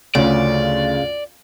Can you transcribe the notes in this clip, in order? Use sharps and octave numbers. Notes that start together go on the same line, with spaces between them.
D2 C#3 C#4 F4 D5